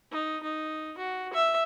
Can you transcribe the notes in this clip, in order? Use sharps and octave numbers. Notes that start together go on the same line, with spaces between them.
D#4
D#4
F#4
E5